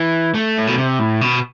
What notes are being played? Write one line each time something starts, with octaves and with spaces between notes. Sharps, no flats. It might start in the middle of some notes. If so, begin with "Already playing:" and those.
Already playing: E3
A3
A2
B2
C3
A2
B2